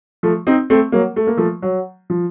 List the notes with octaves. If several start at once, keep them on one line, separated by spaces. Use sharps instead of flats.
F3 A3
C4 D#4
A3 C4
F#3 A#3
A3
A#3
F3 A3
F#3
F3